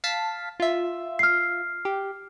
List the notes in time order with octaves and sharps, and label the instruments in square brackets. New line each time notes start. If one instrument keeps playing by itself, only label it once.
[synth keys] F5 A5 B6
F4 E5
[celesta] F6 C7
[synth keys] G4